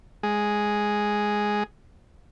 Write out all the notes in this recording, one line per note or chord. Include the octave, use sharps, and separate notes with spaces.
G#3 G#4